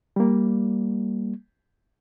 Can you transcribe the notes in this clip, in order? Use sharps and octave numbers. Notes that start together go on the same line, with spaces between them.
G3 A#3